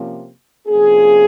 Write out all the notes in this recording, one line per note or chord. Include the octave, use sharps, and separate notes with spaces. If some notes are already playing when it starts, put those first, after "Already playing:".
Already playing: C3 F3 A#3 C#4
C3 F3 A#3 C#4 G#4